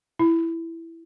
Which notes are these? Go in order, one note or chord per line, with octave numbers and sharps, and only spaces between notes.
E4